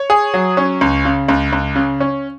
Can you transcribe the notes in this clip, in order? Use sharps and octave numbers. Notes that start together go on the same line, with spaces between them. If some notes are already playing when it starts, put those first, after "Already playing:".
Already playing: C#5
G#4
F#3
C#4
C#2
C#3
C#2
C#2
C#3
C#4